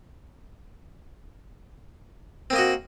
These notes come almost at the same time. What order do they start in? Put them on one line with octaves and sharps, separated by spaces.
C4 A#3 D#5 F#4